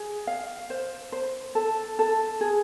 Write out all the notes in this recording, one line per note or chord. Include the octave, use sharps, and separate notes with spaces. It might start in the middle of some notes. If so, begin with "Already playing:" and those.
Already playing: G#4
F5
C5
C5
A4
A4
G#4